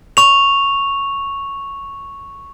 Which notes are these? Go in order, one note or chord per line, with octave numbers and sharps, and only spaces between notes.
C#6 F7